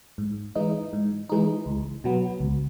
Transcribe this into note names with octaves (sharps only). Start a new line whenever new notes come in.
G#2
E3 G#3 D#4
G#2
E3 G#3 D#4
C#2
B2 F#3 B3
C#2